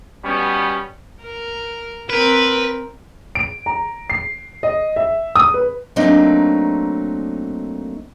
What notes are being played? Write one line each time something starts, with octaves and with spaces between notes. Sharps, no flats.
B2 G3 B3 C#4
A#4
C4 A#4 B4
D7
A#5
C7
D#5
E5
D#6
B4
F#3 A3 A#3 C4 D4 D#4